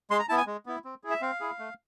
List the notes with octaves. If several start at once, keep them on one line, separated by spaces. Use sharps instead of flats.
G#3 C6
A#5
B3 E4 A5
G#5
G#3
B3 E4
C4
E4 G#4
E5
C4 F5
E4 G#4
A3